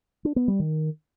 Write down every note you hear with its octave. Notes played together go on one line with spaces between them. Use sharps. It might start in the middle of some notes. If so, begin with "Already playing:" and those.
D4
B3
G3
D#3